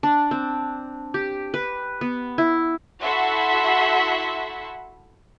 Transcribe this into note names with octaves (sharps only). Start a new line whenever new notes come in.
D4
C4
G4
B4
B3
E4
E4 F#4 A4 E5 F#5 C6